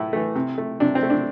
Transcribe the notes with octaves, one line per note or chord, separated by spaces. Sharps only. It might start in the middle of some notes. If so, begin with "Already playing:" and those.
Already playing: A2 E3 A3 E4
E3 A3
C3
A3
C3 D4
C4
A3
D4